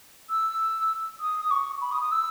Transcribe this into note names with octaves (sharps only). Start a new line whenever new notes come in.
E6
D#6
D#6
C#6
B5
D#6
D#6
E6